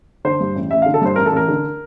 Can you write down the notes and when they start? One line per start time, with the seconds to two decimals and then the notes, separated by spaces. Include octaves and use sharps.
0.25 D3 C5
0.40 G2
0.56 A1
0.71 A1 E5
0.82 F5
0.86 D3
0.94 A4
1.02 G2 C5
1.16 A1 A#4
1.26 A4
1.33 A1 A#4
1.48 D3